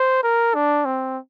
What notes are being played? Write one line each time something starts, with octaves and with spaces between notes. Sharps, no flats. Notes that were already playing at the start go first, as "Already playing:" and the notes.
Already playing: C5
A#4
D4
C4